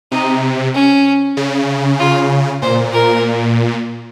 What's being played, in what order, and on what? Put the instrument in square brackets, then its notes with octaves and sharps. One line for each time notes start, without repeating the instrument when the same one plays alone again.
[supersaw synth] C3 [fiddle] D#4
[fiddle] C#4
[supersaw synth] C#3
[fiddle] F4
[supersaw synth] A#2 [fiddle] C5
[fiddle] A#4